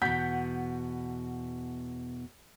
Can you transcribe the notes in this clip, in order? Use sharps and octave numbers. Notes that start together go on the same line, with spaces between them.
E2 B2 F#5 G6 B6